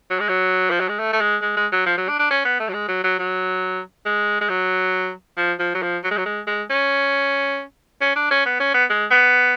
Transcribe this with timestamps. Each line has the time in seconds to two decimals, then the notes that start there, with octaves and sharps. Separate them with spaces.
0.10 F#3
0.20 G#3
0.29 F#3
0.70 F3
0.80 F#3
0.89 G#3
0.99 A3
1.13 A3
1.21 G#3
1.42 G#3
1.57 G#3
1.72 F#3
1.86 F3
1.97 F#3
2.09 D4
2.19 D4
2.31 C#4
2.45 B3
2.60 A3
2.69 F#3
2.74 G#3
2.89 F#3
3.04 F#3
3.19 F#3
4.06 G#3
4.41 G#3
4.49 F#3
5.37 F3
5.59 F3
5.75 F#3
5.82 F3
6.04 F#3
6.11 G#3
6.18 F#3
6.26 G#3
6.47 G#3
6.70 C#4
8.01 C#4
8.16 D4
8.31 C#4
8.46 B3
8.60 C#4
8.74 B3
8.90 G#3
9.11 B3